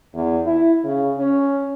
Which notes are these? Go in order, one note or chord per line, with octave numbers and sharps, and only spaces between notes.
E2
E4
C#3
C#4